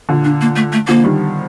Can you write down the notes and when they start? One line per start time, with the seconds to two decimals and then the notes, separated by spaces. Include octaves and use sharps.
0.09 A#2 D3
0.24 D4
0.41 A#3
0.56 A3
0.73 A3
0.88 D3 F3 A#3
1.04 D#3 G3